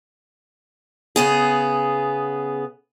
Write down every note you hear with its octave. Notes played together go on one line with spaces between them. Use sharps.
C#3 B3 G#4